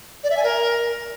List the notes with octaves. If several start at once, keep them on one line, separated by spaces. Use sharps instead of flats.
D5
E5
G#5
A#4